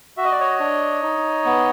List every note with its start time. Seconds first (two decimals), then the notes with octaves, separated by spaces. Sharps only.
0.17 F#4 E5
0.25 D#5
0.32 D5
0.40 C#5 D#5
0.60 D4
1.03 D#4
1.46 B3